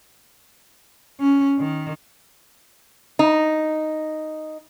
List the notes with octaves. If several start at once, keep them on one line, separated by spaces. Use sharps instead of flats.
C#4
D#3
D#4